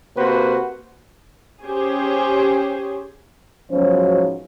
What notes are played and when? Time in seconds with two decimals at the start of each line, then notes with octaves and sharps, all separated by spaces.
0.16 C3 A#3 F#4 B4 C5
1.64 C#4 G4 G#4 C5
3.71 G#2 B2 F3 F#3 C#4 C5